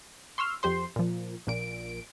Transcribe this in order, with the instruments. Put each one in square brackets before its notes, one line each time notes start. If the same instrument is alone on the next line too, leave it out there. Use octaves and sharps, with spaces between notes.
[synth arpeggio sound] C6 C#6 E6 F6
F2 G4 C5 C6
A#2 F3
A#1 A#2 D7